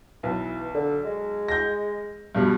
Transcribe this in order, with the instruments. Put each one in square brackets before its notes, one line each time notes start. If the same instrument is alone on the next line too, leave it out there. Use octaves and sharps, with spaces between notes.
[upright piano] B1 [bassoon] E3
[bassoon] D3
G#3
[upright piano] G6 A#6
G2 B2 G3